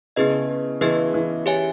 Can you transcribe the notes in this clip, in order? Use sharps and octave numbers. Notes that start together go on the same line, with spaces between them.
C#3 B3 E4 G#4 B4 D#5
E3 B3 E4 G#4 B4 D#5
E3
G4 C#5 E5 G#5